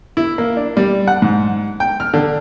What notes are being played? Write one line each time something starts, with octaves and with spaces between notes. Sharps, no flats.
E4
A#3
D4
G3
F#5
G#2
G5
F6
D3